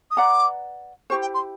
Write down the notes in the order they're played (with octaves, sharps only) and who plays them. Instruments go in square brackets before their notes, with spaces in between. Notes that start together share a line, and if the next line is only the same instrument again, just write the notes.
[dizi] D#6
[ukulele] B4 D5 F#5 A#5 [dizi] D6
[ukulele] E4 G4 C5 [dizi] C#6
[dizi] G5
C6